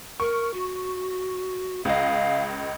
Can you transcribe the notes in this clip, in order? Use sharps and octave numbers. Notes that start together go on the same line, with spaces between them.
A#4 C#6
F#4
C#2 D#5 F5